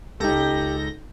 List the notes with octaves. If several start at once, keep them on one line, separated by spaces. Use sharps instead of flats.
C#2 D#4 G4 A4 G6 A#6